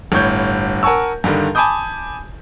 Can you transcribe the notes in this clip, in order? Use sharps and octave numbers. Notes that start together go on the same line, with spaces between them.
G1 A2 C#5 G6
A#4 F#5 G#5 A5 C#6 E6
G2 D3 D#3 G3
G#5 A5 B5 D6 D#6 G6